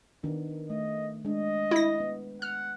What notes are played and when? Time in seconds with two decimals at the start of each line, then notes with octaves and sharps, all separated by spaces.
0.23 D#3 B3 D4
0.70 A3 D#5
1.25 G#3 D4 D#5
1.71 E4 A#6
2.00 B3
2.42 F#5 F6